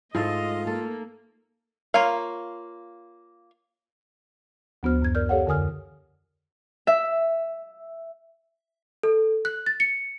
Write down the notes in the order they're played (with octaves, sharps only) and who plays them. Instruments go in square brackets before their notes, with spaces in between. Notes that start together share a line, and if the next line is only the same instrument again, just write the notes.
[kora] G#2 A3 A4 [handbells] E4 [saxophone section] F4 [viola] D#5
[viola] A#3 [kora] A4
[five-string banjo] A#3 F4 C#5 F5
[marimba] D2 F3 B3 F#4 C5 F6
F#2 G#6
A#4 D5 F6 G6
G4 A4 C#5 F5 F#5
F2 D3 A#4 G#5 D#6 F6
[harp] E5
[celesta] A4
F#6
A6
C#7